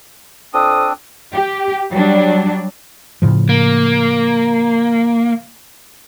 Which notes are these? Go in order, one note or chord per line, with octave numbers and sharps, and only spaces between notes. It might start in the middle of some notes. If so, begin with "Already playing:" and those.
F2 C4 D4 D#6
G4
F#3 G3 D4
A2 C#3 F3
A#3